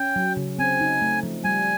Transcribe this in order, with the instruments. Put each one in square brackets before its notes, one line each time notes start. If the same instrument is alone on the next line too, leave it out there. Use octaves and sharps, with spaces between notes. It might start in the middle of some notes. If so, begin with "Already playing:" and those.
Already playing: [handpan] C#4 [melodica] G5
[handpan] F#3
C#3
[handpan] C4 [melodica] G#5
[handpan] D#4
A3
F3
[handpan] G3 [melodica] G#5